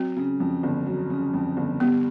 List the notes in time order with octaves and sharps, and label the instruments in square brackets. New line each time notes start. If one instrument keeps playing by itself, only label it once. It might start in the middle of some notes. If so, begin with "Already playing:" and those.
Already playing: [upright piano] F#3 [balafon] C4
[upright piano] C#3
F2
G1
F#3
C#3
F2
G1
[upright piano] G3 [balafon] B3